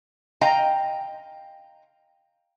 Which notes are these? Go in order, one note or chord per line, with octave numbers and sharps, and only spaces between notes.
D#5 F5 G5 A#5